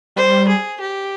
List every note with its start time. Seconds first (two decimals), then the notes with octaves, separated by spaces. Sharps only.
0.16 G3 C5
0.48 G#4
0.80 G4